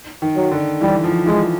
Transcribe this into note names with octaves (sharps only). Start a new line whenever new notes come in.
D#3
F#3
D3
E3 G3
F3
E3 G#3